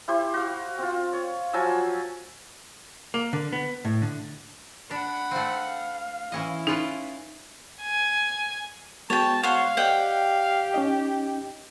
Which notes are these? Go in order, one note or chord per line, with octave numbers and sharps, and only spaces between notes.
E4 G4 C5
F#4 F5
C4 F4
C#5
F3 F#3 G#5 E6
A#3
D3
B3
A2
D3
D4 F#5 B5
A3 C4 F5
E3 C#4 E4 D#5
C#4 D#4 F4 B4
G#5
G#3 B3 F#4 C#5 G5 A5
C5 C#5 F5 F#5
G4 C5 D5 D#5 F#5 G5
C#4 D#4 D#5